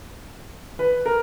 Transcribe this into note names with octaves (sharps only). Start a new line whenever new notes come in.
B4
A#4